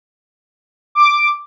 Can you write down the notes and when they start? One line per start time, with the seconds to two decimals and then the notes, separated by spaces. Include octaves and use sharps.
0.95 D6